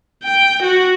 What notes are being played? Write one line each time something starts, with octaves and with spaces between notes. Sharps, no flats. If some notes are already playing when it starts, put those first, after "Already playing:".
G5
F#4